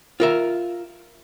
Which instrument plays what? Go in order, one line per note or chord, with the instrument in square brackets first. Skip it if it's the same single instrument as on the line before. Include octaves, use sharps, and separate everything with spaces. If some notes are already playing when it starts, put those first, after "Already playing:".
[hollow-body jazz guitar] F4 A#4 E5